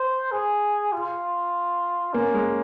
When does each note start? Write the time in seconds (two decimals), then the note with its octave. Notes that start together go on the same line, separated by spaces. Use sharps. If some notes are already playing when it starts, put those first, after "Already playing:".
Already playing: C5
0.32 G#4
0.92 F4
2.13 A#3 C#4
2.34 G#3